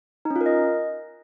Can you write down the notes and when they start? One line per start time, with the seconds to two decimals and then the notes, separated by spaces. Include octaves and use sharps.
0.25 D#4
0.30 C#4
0.36 F4
0.41 A#4
0.46 D#5